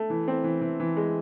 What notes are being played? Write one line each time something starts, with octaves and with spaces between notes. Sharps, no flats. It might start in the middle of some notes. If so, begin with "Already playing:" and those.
Already playing: A3
E3
C4
E3
E3
E3
G#3